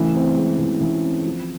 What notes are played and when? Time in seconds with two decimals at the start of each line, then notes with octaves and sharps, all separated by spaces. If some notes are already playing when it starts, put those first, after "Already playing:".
Already playing: C#3 E3 A3
0.15 C4
0.37 G#3
0.59 E3
0.81 E3
1.03 C4
1.26 F3